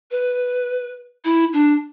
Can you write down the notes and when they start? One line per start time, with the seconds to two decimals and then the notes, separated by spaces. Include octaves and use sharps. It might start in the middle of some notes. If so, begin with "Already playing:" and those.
0.11 B4
1.24 E4
1.53 D4